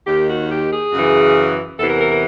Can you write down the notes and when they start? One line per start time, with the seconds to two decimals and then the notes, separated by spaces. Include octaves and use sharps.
0.07 D#2 D#3 G4
0.28 F#4
0.50 G4
0.72 G#4
0.93 F#2 C#3 E3
1.78 E2 C3 E3 A4
1.89 A#4
2.00 A#4
2.10 A#4